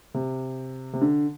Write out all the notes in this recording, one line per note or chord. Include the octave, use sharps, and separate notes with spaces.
C3
C3
D3